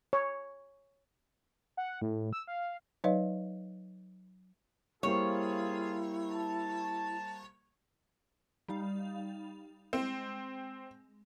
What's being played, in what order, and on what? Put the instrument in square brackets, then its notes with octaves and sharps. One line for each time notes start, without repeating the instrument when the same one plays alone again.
[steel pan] C#5
[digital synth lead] F#5
A2
E6
F5
[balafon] F#3 D#4 B4 C#5 D#5 F5
[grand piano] G3 A#3 C5 [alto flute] E4 [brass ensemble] F4 G#4 [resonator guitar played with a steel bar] C#5
[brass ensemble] A5
[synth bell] G3 D#4 F5
[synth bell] G#3 [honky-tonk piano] C4